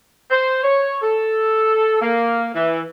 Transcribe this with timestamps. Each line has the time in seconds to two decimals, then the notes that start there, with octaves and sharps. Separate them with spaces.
0.30 C5
0.63 C#5
1.02 A4
2.01 A#3
2.54 E3